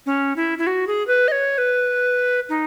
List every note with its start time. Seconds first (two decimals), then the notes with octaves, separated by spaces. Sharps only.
0.06 C#4
0.36 E4
0.58 E4
0.67 F#4
0.87 G#4
1.07 B4
1.28 D#5
1.32 C#5
1.58 B4
2.49 D#4